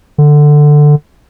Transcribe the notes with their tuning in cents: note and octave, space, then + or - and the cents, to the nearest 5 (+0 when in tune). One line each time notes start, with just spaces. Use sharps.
D3 +10